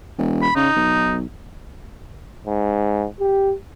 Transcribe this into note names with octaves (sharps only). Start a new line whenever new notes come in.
E1
B5
C#3 D#4
B1
G#2
G4